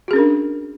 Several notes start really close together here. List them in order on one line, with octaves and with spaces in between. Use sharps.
F#4 G#4 C#4 A#4 D4